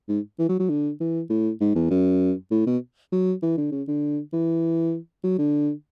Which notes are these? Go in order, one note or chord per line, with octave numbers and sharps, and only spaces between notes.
G#2
E3
F#3
F#3
D3
E3
A2
G#2
E2
F#2
A2
B2
F#3
E3
D3
C#3
D3
E3
F#3
D3